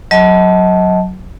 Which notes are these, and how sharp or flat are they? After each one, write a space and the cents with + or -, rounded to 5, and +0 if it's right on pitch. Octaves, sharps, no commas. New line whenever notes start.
F#3 +0 D#5 +30 A5 -5